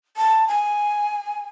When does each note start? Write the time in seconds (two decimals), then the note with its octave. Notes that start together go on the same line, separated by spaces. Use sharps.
0.17 A5
0.48 G#5